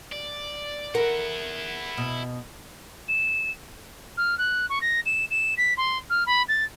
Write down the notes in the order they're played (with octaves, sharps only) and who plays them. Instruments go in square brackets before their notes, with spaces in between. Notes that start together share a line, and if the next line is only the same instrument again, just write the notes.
[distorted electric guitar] D5
[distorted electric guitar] E4 F#5 [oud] A#4
[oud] B2
[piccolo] E7
F6
F#6
C#6
A#6
E7
E7
B6
C6
F6
B5
A6